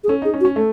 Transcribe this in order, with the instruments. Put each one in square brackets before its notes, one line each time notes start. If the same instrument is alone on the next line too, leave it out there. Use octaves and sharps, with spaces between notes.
[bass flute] G#4
[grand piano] C#4 [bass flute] A4
[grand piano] D#4 [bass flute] G#4
[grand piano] C#4
[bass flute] F#4
[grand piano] C#4
[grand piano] A3 [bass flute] A4